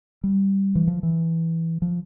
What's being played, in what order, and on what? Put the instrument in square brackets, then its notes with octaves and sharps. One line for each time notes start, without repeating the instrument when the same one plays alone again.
[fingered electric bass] G3
E3
F3
E3
F3